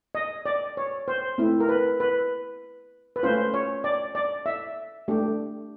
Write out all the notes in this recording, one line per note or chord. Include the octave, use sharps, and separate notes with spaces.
D#5
D5
C#5
C5
A3 C4 E4
A#4
B4
B4
B4
A3 C#4 F4 C5
C#5
D5
D5
E5
A3 D4 G4